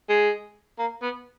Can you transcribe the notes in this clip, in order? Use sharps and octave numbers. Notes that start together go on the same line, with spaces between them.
G#3
A#3
B3